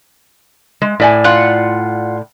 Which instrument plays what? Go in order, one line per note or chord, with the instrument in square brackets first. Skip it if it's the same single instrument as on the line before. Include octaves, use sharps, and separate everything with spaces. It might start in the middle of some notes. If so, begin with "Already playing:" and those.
[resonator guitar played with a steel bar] G#3
A2 D5 G#5
[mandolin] F4 F#5